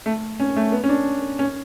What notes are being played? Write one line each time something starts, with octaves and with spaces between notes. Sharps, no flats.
A3
C#4
A3
B3
C#4
D4
C#4